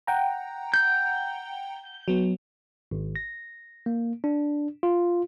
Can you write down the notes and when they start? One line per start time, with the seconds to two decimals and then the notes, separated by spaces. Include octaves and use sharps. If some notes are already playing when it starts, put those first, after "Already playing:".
0.07 F#5 G5 A#5
0.74 G6
2.08 F#3 B3
2.91 G#1
3.16 A#6
3.86 A#3
4.24 D4
4.83 F4